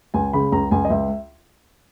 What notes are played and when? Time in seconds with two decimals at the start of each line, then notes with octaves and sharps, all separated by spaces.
0.14 C#2 G#5
0.33 C#3 B5
0.52 C#2 A#5
0.71 C#2 G#5
0.85 D#5
0.90 C#2 E5